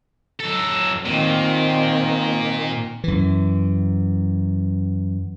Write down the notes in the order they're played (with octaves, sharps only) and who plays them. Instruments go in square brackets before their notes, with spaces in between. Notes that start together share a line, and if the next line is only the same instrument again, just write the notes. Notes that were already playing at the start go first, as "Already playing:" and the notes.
[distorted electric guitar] F#3 A4
[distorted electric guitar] A#2 [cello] D#3 C4
[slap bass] F#2 E3